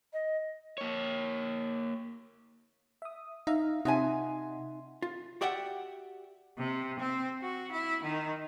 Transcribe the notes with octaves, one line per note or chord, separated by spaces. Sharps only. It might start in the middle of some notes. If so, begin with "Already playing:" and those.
D#5
A#3 C#5
E5 D#6
D#4 E5 F5
C3 D#4 F4 D#5 E5 F#5 G#5
F4
F#4 G4 D5 E5 F#5 G5
C3
C4
F#4
E4
D#3